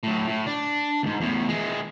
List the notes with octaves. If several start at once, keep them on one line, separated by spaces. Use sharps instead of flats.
A2 F#3
A2
D4
D2 G#2
E2 A2
E3 G#3